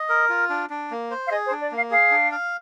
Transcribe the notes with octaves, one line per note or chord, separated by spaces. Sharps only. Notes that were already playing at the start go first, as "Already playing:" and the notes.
Already playing: D#5
A#4
F4
D4
D4
A#3
C5
F5
G#4 D#5
C5
D4
D5
A#3 F5
G#4 F5
D4
F5